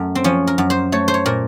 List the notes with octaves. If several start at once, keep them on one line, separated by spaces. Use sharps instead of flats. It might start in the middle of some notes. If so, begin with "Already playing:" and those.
Already playing: F#2 A3
C4
F3 C#4
A#4
F#2
C5
A3 C#5
C5
C#5
A#2 A#4